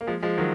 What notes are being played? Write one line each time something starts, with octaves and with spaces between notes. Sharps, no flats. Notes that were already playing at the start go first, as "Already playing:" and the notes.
A#3
F3 G#3
F3 G#3
D#3 F#3